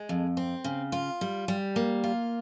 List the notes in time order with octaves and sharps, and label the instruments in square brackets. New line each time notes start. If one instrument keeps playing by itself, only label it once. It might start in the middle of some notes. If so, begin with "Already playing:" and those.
Already playing: [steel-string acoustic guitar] G#3
F2
C4
C#3
F4
G3
G3
A#3
F4